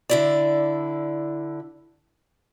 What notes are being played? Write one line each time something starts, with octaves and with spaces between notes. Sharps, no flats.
D3 E4 D5